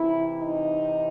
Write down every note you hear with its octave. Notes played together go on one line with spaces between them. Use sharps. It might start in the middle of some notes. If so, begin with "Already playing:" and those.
Already playing: C3 E3 E4
D#4